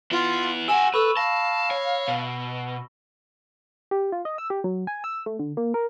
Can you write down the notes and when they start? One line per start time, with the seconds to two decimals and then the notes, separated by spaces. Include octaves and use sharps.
0.11 B3 E4 F4
0.68 G4 F#5 G#5 E6 E7 F#7
0.94 A4 B4 B5 C#6 E6
1.17 F5 A5 A#6
1.71 C#5
2.08 B2
3.91 G4
4.12 F4
4.25 D#5
4.38 E6
4.50 G4
4.64 F#3
4.87 G#5
5.04 E6
5.26 A3
5.39 D3
5.57 A#3
5.74 A#4